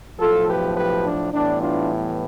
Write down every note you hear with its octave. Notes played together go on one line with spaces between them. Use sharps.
B1 A2 F3 F4 A4
G4 B4
G4 B4
D4
A2 E3 G3 B3 D4
D4 F4